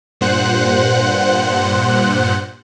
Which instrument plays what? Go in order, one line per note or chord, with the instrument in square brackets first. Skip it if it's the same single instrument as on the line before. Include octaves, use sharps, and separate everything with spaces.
[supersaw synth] G2 A#2 C5 F#5 F#6